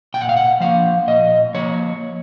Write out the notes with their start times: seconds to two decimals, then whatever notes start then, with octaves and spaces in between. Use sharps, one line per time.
0.14 A#2 G5
0.21 F#5
0.29 F5
0.37 F#5
0.60 F3 A#3 F5
1.07 A#2 D#5
1.54 F3 A#3 C#5